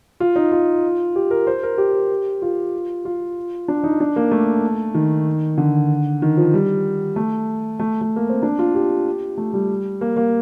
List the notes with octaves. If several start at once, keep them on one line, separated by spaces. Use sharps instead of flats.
F4
D#4
F4
G4
A#4
C5
A#4
G4
F4
F4
D4
D#4
D4
A#3
A3
D#3
D3
D#3
F3
G3
A3
A3
A3
A#3
C4
D4
F4
G4
A3
G3
A#3
A#3